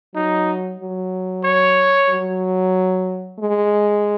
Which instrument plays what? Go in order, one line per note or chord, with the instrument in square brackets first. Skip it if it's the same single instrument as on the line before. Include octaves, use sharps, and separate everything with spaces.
[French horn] F#3 [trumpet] D#4
[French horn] F#3
[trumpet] C#5
[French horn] F#3
G#3